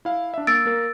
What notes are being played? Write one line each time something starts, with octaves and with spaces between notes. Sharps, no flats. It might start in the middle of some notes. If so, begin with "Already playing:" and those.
E4 F5
D4 E5
A#3 E6 A6 D7
A#3 A#4